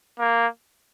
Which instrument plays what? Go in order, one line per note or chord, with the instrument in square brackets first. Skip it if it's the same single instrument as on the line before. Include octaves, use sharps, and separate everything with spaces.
[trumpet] A#3